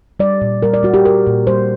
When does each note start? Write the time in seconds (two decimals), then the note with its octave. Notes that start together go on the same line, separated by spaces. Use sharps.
0.20 G3 D5
0.41 A#2
0.62 G3 A#4
0.74 D5
0.83 G3 F#4
0.94 G4
1.05 G3 A#4
1.26 A#2
1.47 G3 C5